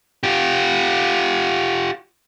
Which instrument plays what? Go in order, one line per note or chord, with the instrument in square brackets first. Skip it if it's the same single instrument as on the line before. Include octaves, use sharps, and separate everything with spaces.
[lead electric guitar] F4 G4